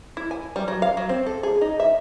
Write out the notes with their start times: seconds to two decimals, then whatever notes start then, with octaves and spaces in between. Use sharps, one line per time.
0.17 E4
0.31 G#5
0.56 G3
0.68 F#3
0.82 F5
0.97 F#3
1.09 C4
1.26 A4
1.43 G#4
1.61 D#4
1.80 E5